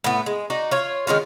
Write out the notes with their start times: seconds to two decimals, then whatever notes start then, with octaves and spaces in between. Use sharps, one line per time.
0.04 A2 B3
0.26 G#3
0.50 D#4 F#4 D5
0.71 F4 C#5
1.07 D#3 G#3 C#4 F4